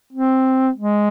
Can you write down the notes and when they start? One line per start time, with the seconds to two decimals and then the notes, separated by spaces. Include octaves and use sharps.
0.13 C4
0.76 G#3